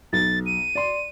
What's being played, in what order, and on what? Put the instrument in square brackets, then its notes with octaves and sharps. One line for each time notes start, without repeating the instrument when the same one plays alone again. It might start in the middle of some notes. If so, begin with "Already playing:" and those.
[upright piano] B1 [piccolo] A6
[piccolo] D#7
[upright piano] D5 C6